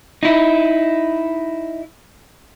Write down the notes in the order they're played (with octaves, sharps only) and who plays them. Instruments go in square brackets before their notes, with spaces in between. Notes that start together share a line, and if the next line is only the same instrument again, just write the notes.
[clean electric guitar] D#4 E4